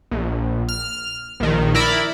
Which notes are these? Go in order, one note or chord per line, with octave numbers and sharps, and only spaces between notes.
A#1
F6
A#1 D#3
E4 A#4 D5 B5